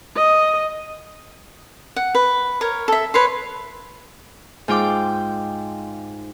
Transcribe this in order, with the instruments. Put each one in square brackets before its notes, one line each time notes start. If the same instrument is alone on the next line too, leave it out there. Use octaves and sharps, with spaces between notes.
[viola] D#5
[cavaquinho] F#5
B4
A#4 C#5
A4 E5
B4 C#5 C6
[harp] G#2 F4 G5 D6